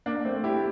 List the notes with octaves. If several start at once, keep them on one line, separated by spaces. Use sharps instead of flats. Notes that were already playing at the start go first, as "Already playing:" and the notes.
A#3 D4
A3 C4
E4 G4